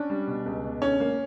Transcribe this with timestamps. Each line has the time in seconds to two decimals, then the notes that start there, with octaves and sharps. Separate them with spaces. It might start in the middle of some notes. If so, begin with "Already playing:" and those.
Already playing: C#4 D4
0.10 G3
0.27 B2
0.46 C#2
0.64 B2
0.81 D3 C#4
1.00 A#3